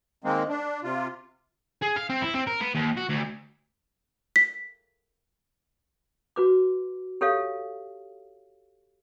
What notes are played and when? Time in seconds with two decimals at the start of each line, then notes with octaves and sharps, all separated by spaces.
0.24 D#3 G#3 A#3 C4
0.49 D4
0.83 C3 F4
1.82 G#4
1.96 F5
2.10 C4
2.22 E4
2.34 C4
2.47 A#4
2.61 B3
2.75 D#2
2.97 F#4
3.09 D2
4.36 B6
6.36 F#4 B4 D6
7.21 G4 A4 C#5 E5 F5